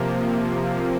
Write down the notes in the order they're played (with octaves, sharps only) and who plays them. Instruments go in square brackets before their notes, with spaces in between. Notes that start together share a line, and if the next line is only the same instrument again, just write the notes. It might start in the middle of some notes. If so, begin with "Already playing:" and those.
Already playing: [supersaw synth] C3 F3 A#3